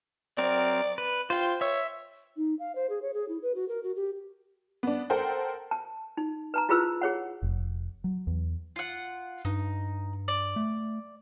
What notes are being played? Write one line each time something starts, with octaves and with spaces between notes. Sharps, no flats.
F#3 C4 A#4 D5
B4
F4 C5 G5
C#5 E5 E6
D#4
F5
C5
G#4
C#5
G#4
E4
B4
F#4
A#4
F#4
G4
B3 D4
A4 A#4 C5 F#5 G5
A5
D#4
B4 A5 A#5
E4 F4 G#4 B4 C5 E6
G#4 C#5 F#5
F1
F#3
E2
F4 F#5
G2 D#4
D5
A3